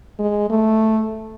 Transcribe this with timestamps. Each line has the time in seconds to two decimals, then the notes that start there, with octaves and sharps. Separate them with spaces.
0.19 G#3
0.50 A3